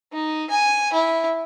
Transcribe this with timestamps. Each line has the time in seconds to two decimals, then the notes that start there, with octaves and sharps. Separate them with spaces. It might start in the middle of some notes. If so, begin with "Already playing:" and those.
0.12 D#4
0.50 G#5
0.93 E4